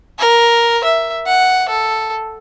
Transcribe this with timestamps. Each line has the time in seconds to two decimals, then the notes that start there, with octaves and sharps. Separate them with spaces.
0.19 A#4
0.84 E5
1.27 F#5
1.69 A4